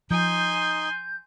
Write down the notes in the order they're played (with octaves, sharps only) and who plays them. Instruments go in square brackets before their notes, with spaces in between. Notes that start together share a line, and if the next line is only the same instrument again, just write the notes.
[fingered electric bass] F3 [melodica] D#4 [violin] G#5 C6 [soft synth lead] G6